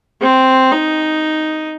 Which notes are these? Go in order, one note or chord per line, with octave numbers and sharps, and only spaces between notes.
C4
D#4